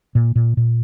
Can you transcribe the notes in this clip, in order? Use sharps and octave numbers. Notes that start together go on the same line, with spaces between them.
A#2
A#2
A#2